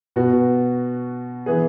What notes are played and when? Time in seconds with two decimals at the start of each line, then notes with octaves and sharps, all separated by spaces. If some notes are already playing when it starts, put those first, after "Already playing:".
0.16 B2 B3 F#4
1.46 E3 B3 G#4